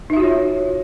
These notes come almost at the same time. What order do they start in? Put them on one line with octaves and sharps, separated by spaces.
D#4 E5 F#4 F4 C#5